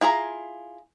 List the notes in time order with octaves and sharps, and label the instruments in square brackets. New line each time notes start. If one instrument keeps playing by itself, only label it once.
[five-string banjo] E4 F4 G#4 A#5